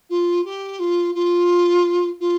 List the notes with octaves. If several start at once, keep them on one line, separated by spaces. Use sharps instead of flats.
F4
G4
F4
F4
F4